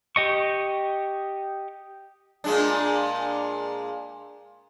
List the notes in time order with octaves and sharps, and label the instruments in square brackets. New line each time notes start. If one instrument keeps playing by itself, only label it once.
[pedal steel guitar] G4 D#5 C#6
[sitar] A#2 G#3 D4